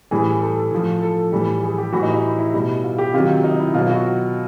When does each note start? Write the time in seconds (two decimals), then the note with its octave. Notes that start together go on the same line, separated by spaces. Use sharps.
0.11 A2 E3 G3 G#4
0.42 A4
0.71 A2 F3
1.02 A4
1.32 A2 E3 G3
1.63 G#4
1.78 G4
1.93 A2 E3 G3 F#4
2.03 D#4
2.13 E4
2.39 E4
2.53 B2 G3
2.84 F4
2.98 G4
3.14 C3 D#3 F#3 F4
3.44 D#4
3.59 E4
3.74 B2 F#3 F4
3.89 F#4